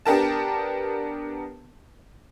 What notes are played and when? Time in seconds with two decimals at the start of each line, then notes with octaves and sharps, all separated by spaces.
0.06 B3 D4 G4 A#4 A5